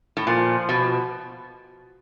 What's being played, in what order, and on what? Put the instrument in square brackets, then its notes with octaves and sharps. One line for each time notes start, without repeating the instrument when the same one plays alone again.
[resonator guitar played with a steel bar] A2
[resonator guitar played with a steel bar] A#2 [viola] F3
[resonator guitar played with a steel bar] B2